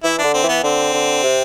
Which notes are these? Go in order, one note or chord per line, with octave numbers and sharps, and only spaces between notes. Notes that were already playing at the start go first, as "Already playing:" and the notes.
E3 E4
D4
D3
C4
E3 B3
D3 C4
D3
C3